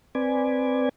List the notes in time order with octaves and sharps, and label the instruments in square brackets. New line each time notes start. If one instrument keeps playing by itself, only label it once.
[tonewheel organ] C4 B4 D5 G#5